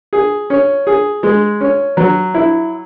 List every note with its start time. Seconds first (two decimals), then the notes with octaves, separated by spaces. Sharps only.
0.13 G#4
0.50 C#4
0.87 G#4
1.23 G#3
1.61 C#4
1.97 F#3
2.34 E4